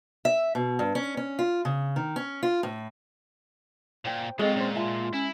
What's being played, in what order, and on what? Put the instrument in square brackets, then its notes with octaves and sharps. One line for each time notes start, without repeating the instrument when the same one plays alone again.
[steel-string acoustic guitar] E5
B2
G2
C#4
C#4
F4
C#3
D#3
C#4
F4
A2
[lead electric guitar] A#2 [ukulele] C5 G5
[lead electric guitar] F#3 F4 [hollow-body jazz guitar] G#3 [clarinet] C4 [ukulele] G#4 A4 D#5
[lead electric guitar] A#2 [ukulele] C#4 C5
[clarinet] F4 [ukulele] E5 A5
[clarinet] C#4 [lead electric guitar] E4